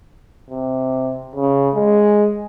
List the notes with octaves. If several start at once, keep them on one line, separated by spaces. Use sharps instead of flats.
C3
C#3
G#3